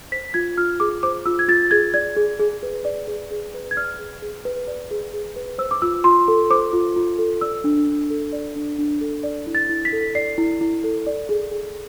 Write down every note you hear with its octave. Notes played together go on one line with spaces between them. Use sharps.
C5 B6
F4 G#6
F4 F6
G#4 D6
C5 D6
F4 E6
G#6
F4 A6
G#4 G#6
D5 G#6
G#4
G#4
B4
D5
G#4
G#4
B4
G#6
D5 F6
G#4
G#4
B4
D5
G#4
G#4
B4
C5 E6
D6
F4 E6
F4 C6
A4
C5 D6
F4
F4
A4
D5 E6
D4
D4
A4
D5
D4
D4
A4
D5
E4
A6
E4
B6
A4
D5 C7
E4
E4
A4
D5
G#4
G#4